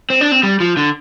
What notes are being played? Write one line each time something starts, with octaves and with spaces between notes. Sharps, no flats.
C4
D4
C4
G3
F3
D3